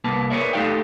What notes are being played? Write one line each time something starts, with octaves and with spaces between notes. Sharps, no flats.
C2 A#3 B4 A5
G#4 A#4 B4 C#5 D5 E5
A3 D#4 G4 A4 F5 G5